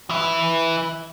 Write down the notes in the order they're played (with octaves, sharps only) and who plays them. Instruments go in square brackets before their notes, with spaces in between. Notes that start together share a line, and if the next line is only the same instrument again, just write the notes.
[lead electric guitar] E3 E4